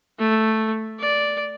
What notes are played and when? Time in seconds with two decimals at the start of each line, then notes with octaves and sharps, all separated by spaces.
0.19 A3
1.00 D5